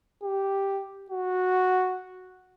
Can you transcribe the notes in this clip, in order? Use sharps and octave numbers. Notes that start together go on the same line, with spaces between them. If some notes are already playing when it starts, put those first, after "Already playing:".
G4
F#4